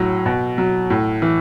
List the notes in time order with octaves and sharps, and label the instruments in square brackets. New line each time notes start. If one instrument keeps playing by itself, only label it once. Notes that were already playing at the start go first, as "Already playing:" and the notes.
Already playing: [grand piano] A2 F#3
B2
F#3
A2
E3